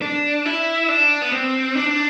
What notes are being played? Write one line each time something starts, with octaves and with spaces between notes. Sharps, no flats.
D4
E4
D4
B3
C4
D4